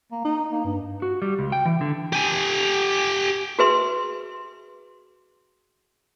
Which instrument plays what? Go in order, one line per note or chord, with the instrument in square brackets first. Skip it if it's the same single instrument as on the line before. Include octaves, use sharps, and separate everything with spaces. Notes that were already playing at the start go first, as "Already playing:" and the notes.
[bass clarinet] A#3
D#4
A#3
G2
[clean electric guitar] F#4
G3
C#2
G5
E3
D3
[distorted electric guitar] G4 G#5
[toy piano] F#4 G#4 B4 E5 C6